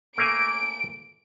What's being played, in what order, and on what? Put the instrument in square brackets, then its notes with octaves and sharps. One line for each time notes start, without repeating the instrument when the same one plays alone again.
[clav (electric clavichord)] A3 A#3 G#5 [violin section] D7